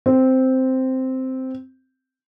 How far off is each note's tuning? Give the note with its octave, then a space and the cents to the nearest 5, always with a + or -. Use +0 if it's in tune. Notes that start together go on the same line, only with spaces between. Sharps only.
C4 -5